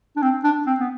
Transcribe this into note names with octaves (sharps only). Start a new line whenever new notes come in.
D4
C4
D4
C4
B3